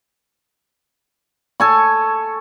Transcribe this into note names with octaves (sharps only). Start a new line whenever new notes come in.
A4 G#5 C#6